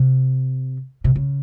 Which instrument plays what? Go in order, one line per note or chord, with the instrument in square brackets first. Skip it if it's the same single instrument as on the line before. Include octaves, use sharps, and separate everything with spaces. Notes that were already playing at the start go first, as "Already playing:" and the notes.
Already playing: [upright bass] C3
C3
C#3